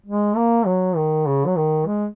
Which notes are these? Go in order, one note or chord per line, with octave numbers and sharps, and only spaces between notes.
G#3
A#3
F#3
D#3
C#3
F#3
D#3
G#3